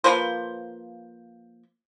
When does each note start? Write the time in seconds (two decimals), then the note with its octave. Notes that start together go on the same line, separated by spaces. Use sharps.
0.04 F3 A#3 B4 C5